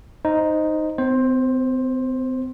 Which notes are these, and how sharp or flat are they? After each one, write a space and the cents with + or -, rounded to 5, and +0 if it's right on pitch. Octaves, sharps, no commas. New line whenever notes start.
D#4 +0 C5 +0
C4 -40 C5 +15